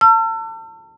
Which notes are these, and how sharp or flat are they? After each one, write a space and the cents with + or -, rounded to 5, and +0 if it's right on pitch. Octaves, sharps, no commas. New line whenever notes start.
A5 +35 E6 +40